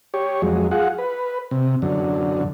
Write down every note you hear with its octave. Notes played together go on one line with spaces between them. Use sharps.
G4 C#5
F2 F#3 G#3
F4 G#4 F#5
B4
C3
F#2 D3